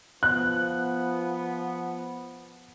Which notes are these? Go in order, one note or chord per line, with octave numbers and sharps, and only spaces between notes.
F3 B3 F#6